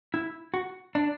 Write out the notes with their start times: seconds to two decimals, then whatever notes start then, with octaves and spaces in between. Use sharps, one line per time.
0.14 E4
0.54 F#4
0.95 D4